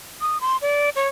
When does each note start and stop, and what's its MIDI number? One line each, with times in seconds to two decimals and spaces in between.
0.21 0.38 87
0.41 0.57 84
0.62 0.90 74
0.96 1.08 73